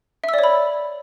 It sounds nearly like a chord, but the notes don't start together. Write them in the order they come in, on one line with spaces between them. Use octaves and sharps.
E5 E6 D5 C#5 B5